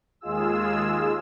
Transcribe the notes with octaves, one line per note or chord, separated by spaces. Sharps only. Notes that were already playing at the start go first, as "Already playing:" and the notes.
D#2 G#3 F4 G#4 E6